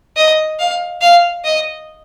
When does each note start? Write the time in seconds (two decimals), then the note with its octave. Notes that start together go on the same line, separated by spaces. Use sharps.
0.17 D#5
0.59 F5
1.01 F5
1.44 D#5